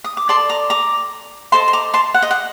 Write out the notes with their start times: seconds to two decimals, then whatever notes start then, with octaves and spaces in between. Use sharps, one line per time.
0.04 D#6
0.17 D6
0.29 A4 D5 A5 C6
0.49 A#5 D6
0.70 A#5 D6
1.52 A4 C5 D#5 A5 C6
1.68 C6
1.73 A#5 D6
1.94 A5 C6
2.14 F#5
2.22 D#5
2.31 F#5